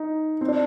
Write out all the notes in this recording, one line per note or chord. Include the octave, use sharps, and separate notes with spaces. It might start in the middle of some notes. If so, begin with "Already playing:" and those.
Already playing: D#4
C4
D4